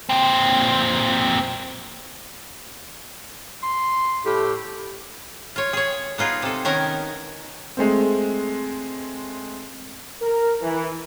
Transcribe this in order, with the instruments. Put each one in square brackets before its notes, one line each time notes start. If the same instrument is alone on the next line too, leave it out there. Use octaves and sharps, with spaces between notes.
[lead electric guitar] A#2 C4
[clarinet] C6
[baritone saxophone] A2 [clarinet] G4
[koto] F4 C#5
G#4 C#5
B3 D#4 F4 G#4
C3 A4
D#3 B3 C#4 A#4 G#5 A#5
[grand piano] G#3 A3 C4
[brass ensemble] A#4
E3